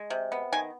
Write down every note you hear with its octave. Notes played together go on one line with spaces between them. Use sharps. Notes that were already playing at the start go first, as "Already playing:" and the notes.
Already playing: G#3
C3
B3
D#3 G#5